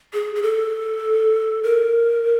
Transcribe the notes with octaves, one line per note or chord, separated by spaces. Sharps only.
G#4
G#4
A4
A#4